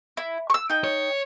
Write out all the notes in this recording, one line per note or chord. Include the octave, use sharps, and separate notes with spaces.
E4
C#6 E6
D#4 G5
C#5